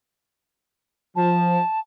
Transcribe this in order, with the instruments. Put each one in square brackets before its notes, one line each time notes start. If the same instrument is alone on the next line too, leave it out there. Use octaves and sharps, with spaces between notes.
[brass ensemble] F3 [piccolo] A5